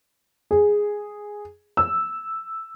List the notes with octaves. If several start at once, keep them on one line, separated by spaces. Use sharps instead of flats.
G#4
E6